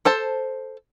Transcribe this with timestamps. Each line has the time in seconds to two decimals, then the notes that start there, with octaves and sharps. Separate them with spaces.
0.05 A4 C5 A5